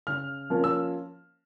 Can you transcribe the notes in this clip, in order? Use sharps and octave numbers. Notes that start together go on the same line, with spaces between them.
C#3 F6
F3 A#3 C#4
E6